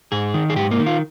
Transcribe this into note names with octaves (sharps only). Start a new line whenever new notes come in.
G#2 G#4
D#3
G#4
G#2 G4
A#3
D#3
F4